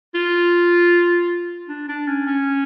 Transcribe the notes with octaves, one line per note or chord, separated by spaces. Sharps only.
F4
D4
D4
C#4
C#4